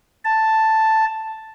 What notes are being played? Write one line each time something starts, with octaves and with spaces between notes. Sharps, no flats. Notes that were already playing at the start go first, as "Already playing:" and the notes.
A5